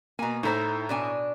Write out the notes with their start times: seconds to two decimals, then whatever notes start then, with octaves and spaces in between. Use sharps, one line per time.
0.19 B2 A#3 G#5 A#5
0.43 A2 D#4 E4 A4 C5 A#5
0.89 B2 D4 G#5